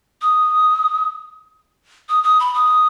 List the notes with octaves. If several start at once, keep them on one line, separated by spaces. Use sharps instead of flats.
D#6
D#6
D#6
B5
D#6